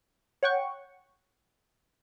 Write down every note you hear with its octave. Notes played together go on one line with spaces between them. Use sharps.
C#5 F#5 G5 C#6